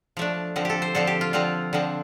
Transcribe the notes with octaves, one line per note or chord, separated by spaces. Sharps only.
F3 A3 D4
D3 F3 C4
G4 A4
C5
D3 F3 C4 A4
G4
F4
D3 F3 C4 F4
D3 F3 C4